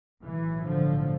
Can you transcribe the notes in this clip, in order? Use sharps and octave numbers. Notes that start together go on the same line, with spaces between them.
B1 A2 E3
D3 F3